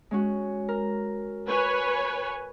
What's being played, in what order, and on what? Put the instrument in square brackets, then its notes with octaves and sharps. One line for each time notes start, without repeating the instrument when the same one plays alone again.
[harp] G#3 C#4 F#4
A#4
[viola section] B4 C#5 G#5